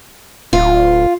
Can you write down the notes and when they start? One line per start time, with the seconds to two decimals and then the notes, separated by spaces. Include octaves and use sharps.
0.53 D1 F4